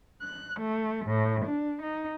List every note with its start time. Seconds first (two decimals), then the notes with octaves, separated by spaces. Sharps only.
0.23 F#6
0.58 A3
1.05 A2
1.45 D4
1.81 D#4